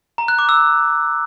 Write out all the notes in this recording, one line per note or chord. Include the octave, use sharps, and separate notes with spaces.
A#5
F#6
D6
E6